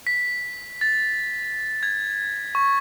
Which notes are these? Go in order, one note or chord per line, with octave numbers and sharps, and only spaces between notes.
B6
A6
G#6
C#6